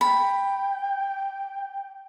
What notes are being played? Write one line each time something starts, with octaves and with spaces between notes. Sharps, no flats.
G5 B5